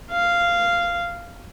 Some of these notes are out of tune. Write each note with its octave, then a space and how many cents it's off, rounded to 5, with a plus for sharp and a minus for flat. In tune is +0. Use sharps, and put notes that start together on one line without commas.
F5 -10